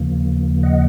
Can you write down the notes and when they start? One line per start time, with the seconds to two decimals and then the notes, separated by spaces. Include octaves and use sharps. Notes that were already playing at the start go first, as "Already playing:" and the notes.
Already playing: D#2 C#3 F3 A#3
0.63 D#5 F#5